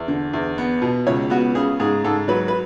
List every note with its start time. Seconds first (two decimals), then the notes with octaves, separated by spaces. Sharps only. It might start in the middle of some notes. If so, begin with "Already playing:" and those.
Already playing: E2
0.08 D3
0.33 E2
0.58 B3
0.82 B2
1.07 C#2 C#5
1.30 B3 F#4
1.55 C#3 G#4
1.80 G#2 G#4
2.05 G#2 A4
2.28 F#3 B4
2.48 B4